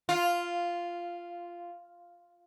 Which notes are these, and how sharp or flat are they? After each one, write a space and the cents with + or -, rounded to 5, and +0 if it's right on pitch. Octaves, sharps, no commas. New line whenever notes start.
F4 -5